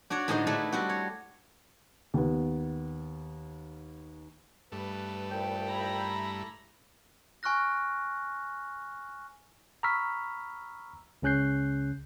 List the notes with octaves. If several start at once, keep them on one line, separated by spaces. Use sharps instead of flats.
D4 F#4 C#5 D5
A2 D3 G#3 D#4 G#4 C5
A3 D4 E4 G#4 B4 A5
G3 C4 F#4
C#5
D#2 B3
G2 A3 B4
C2 A#2 G5
E4 A#5 B5
G#5 C#6 F6 F#6 A#6
A#5 B5 C#6 E6 F6 B6
C#2 C#3 C#4 F#6 G6 C7